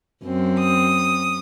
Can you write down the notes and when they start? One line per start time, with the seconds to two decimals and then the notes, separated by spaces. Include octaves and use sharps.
0.24 F#2 C4
0.59 D#6